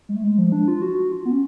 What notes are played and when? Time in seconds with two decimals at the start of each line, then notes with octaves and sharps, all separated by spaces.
0.09 G#3
0.16 A3
0.24 G#3
0.38 F3
0.52 D4
0.68 F4
0.82 F#4
1.12 F4
1.25 B3
1.31 C#4